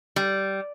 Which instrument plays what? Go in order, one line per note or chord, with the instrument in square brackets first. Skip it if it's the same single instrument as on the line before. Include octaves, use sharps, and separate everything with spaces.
[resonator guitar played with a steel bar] G3